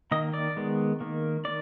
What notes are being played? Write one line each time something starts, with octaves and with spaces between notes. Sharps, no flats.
D#3 A#3 D#5
D5
D#3 G#3 B3
D#3 A#3
D#3 D5